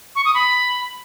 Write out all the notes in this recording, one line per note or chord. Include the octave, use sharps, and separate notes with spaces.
C#6
D#6
B5